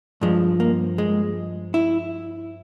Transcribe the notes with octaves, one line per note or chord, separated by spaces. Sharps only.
G2 F3 G#3
A#3
G#3
E4